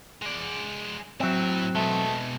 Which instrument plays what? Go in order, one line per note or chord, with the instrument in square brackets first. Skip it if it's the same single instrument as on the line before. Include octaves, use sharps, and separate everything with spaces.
[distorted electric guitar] G#3 D5
[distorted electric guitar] A2 E5 [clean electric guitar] F#3 C4
[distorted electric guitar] B2 G#3 [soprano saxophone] A3